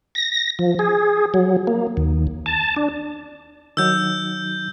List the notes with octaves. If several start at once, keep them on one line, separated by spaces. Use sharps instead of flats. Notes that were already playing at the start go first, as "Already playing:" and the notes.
A#6
F3
G#4
F#3
A#3
D#2
A5
D4
D#3 F#3 D#4 E6 G6